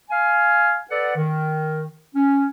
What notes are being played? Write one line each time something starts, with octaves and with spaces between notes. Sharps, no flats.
F5 G#5
A4 B4 D5 F#5
D#3
C#4